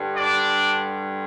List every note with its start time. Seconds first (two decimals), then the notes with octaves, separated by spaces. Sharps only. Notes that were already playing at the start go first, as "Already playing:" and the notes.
Already playing: G2 D3 G3
0.16 D4 D5